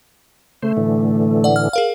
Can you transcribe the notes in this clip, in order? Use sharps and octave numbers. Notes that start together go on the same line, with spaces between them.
C#3 A3 C5
A2 D3 E3
D5 F#5
F6
G#4 A#4 F5